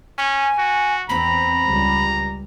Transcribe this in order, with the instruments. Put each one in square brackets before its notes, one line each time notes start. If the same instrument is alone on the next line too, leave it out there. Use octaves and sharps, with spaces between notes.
[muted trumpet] C#4 [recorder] G#5
[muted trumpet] F#4
[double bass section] E2 C4 [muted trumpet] A#5 [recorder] B5
[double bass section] C#2 G3